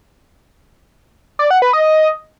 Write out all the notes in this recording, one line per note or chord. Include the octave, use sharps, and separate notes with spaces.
D5
F#5
B4
D#5